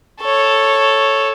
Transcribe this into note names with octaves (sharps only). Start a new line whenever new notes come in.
A4 C#5